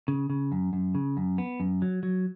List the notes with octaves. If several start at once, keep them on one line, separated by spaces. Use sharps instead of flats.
C#3
C#3
F#2
F#2
C#3
F#2
B3
F#2
F#3
F#3